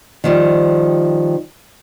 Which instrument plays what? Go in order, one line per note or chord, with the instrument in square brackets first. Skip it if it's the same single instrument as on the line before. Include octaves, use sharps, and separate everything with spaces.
[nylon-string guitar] D#3 F3 G3